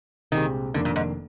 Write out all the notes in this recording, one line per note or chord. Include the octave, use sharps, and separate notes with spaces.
C2 A#2 D#3 G#3 C4 G4
F1 F2 D3 D#3 A#3 D4
A#2
G#2